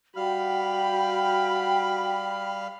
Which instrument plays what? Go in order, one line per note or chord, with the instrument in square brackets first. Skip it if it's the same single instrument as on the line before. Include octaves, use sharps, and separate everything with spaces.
[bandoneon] G3 F5 F6 [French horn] F#4 [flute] G5 [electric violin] B5